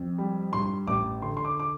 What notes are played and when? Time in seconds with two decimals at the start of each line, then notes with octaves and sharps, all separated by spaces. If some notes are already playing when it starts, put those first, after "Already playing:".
Already playing: F2
0.18 G3
0.53 G2 C6
0.87 A1 D6
1.22 D3 C6
1.37 C6
1.45 D6
1.60 D6